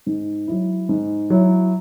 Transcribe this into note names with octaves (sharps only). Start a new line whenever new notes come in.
G#2
F#3 E4
G#2
F#3 E4